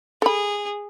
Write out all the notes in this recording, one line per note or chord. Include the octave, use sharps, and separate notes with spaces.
G#4 A4 B5